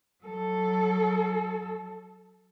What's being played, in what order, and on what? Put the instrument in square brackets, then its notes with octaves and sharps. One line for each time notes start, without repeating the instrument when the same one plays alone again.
[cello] F#3 A4